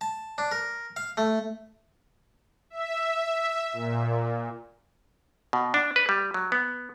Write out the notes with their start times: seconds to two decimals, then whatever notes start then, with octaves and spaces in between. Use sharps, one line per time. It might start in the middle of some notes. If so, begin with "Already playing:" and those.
0.01 A5
0.38 D4
0.51 A#4
0.96 F5
1.17 A3
2.70 E5
3.73 A#2
5.53 B2
5.74 D4
5.96 B4
6.09 G3
6.34 F#3
6.52 B3